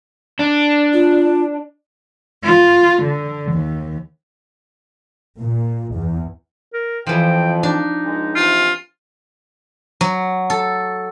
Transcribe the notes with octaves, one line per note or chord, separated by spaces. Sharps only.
D4
F4
F4
D3
D#2
A#2
E2
A#4
F2 E3 F3 G5
D4 D#4
C#2 G#3
E2 C3 E3 F4
F#3
A4